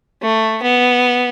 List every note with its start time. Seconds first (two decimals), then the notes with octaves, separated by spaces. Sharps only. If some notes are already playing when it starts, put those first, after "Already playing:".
0.22 A3
0.63 B3